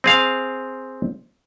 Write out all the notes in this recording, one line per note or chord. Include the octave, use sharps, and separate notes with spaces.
C4 G#4 F5